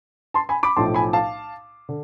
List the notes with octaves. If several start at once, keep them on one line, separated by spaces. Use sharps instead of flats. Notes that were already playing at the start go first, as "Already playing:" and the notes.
A5 C6
G#5 B5
B5 D6
B1 A2 F3 A5 C6
G#5 B5
F5 A5
D3